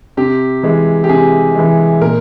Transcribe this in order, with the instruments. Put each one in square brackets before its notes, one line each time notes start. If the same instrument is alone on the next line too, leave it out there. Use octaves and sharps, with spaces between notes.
[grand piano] C3 G4
E3 G#3
G4
C3 G#4
E3 G#3
A#2 A#4